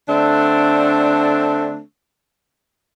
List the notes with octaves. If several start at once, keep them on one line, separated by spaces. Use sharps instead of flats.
D3 A3 C4 D4